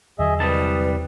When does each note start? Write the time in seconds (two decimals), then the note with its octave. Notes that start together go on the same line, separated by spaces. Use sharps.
0.19 E2 D3 F#3 G#4 D#5 E5
0.40 C2 G3 B4 A5 D#6